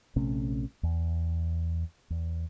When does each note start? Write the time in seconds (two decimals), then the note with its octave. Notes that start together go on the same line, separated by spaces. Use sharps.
0.16 A#1 C3 A3 C#4
0.83 E2
2.10 E2